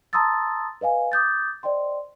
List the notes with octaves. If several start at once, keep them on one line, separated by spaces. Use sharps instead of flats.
A5 A#5 C6 D#6 E6 A6
B4 D#5 F5 G#5
D6 D#6 G6 A6
C5 D5 D#5 G5 C6